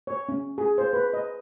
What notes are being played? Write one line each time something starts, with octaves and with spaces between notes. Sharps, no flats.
C#5
C#4
G#4
C5
B4
D#5